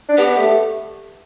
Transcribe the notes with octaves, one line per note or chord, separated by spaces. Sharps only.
D4
B3 G4
A3